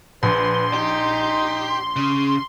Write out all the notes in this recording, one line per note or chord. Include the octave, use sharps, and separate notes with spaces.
A#1 B4 C6
D#4 G4
C#3